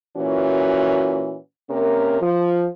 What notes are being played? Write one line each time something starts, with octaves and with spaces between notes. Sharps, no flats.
A#2 E3 C#4 F#4
C3 A#3 C#4 A#4
F3